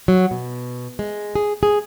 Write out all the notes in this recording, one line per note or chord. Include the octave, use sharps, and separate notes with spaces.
F#3
B2
G#3
G#4
G#4